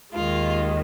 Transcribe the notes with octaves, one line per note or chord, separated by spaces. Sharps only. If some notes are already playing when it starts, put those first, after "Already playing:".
D#2 D#3 G#3 F4